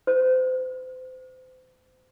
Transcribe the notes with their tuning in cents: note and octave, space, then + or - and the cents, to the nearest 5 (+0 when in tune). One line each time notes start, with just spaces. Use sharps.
C5 -35